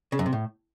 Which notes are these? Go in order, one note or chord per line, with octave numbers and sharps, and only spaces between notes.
C#3
F#2
C3
A2